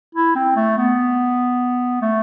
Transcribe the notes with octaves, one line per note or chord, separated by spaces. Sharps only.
E4
C4
A3
B3
A3